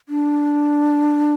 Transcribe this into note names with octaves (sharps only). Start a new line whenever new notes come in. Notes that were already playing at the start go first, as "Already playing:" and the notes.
D4